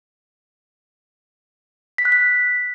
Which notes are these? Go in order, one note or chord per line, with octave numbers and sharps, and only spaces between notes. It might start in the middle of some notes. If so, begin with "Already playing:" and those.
B6
F#6
B6